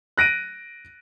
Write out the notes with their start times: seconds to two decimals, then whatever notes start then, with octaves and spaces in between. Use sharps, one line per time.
0.17 F#6 A#6 D7 D#7